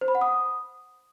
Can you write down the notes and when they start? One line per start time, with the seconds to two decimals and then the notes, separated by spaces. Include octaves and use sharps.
0.01 C5
0.08 B5
0.15 F#5
0.21 D#6